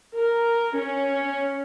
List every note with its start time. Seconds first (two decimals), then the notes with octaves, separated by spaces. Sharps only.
0.16 A#4
0.77 C#4